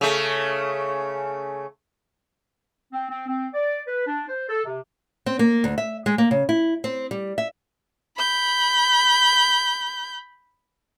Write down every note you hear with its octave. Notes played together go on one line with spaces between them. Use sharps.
C#3 A3
C4
C4
C4
D5
B4
D4
C5
A4
C3
C4
A#3
D2
E5
G#3
A#3
C#3
E4
C4
G3
E5
B5 G6